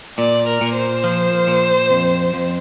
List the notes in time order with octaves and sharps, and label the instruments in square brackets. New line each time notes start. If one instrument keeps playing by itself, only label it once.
[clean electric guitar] A#2 [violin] D5
[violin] A#4
[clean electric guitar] A#2
[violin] C5
[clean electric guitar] F3
A#2
F2
F2